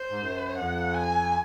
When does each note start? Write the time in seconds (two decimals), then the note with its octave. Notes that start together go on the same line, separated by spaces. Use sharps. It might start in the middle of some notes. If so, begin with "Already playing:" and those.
Already playing: C5
0.10 G#2
0.20 F#2
0.58 F2 F#5
0.95 G#5